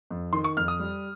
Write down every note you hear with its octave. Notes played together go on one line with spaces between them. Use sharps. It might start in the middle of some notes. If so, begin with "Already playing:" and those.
F2
D#3 C6
C#6
F2 F6
D#6
G3